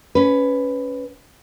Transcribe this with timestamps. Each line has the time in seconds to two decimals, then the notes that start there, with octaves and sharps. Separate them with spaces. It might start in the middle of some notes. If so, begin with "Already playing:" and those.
0.15 C#4 B4